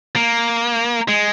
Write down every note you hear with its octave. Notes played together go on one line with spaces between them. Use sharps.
A#3
G#3